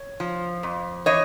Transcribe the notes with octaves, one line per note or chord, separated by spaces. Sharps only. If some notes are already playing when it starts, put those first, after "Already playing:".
Already playing: C#5
F3
F2
E3 C#5 D#5